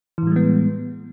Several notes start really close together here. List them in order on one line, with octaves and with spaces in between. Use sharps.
E3 A2 G3 G#3 B3